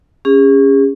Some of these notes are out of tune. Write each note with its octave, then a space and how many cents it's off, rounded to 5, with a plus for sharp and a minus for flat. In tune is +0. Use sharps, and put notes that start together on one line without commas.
C#4 +0 G#4 -40